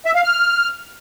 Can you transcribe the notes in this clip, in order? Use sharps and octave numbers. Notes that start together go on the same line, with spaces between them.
E5
F5
F6